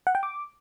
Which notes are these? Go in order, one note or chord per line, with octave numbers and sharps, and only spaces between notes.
F#5
G5
D6